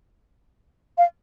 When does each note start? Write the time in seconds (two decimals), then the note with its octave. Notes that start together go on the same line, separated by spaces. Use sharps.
0.98 F5